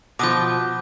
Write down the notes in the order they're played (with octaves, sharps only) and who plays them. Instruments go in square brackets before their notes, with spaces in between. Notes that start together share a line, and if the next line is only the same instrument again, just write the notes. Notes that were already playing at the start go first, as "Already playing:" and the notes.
[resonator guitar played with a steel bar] B2 F3 [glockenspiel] D6 D#6 G6